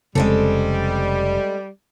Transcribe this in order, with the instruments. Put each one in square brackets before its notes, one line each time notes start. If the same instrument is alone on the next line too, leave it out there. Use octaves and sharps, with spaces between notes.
[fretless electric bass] F1 C#3 [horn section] G3 [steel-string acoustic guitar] G#3 C4 A4